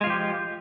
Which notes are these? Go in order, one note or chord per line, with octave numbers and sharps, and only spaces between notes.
F3 G#3 F4 G4